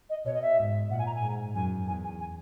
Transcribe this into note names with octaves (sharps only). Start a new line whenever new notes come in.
D#5
B2 C#5
D#5
E5
G#2
A#2 F#5
G#5
A#5
G#5
G#2
F#2 G#5
E2 G#5
G#5
G#5